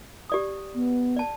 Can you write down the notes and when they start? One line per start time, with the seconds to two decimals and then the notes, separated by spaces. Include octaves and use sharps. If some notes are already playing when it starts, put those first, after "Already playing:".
0.30 G4 D5 D#6
0.75 B3
1.16 D5 A5